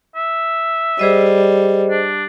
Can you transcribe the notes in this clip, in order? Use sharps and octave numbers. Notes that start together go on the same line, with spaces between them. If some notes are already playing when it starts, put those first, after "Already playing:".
E5
G3 G#4 C5 D#5
D4